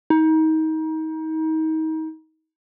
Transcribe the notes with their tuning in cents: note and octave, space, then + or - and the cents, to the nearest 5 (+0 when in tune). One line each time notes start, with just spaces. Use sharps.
D#4 +30